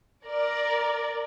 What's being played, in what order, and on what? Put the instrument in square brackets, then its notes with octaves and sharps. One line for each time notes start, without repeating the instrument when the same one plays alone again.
[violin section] A#4 D5